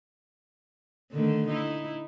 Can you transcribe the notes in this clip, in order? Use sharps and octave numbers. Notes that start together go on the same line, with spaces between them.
D3 D#3 A3
D#4 E4